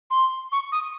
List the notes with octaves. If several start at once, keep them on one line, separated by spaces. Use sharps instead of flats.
C6
C#6
D#6